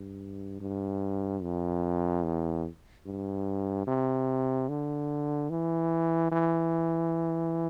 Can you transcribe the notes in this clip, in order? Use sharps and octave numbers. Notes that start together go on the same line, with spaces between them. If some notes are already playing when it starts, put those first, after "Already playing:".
Already playing: G2
G2
F2
E2
G2
C3
D3
E3
E3